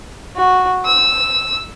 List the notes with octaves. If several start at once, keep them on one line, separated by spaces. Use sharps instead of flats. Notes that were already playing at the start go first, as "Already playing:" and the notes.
F#4
E6